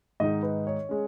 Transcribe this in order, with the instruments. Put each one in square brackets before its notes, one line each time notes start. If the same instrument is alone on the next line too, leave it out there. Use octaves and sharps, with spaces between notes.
[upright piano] G#2 D#3 G#3 D#4 D#5
B4
C#5
G#3 C#4